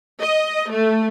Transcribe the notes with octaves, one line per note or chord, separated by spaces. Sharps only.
D#5
A3